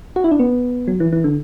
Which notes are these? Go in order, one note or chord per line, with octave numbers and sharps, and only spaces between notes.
F#4
E4
D4
B3
F#3
E3
E3
D3